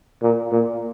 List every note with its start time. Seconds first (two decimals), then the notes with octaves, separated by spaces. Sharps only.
0.22 A#2
0.52 A#2